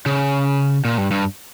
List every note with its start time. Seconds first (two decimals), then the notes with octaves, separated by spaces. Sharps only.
0.06 C#3
0.85 A#2
0.98 G2
1.11 G2